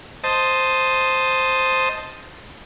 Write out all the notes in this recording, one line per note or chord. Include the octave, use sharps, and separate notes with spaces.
C5 D#5 A5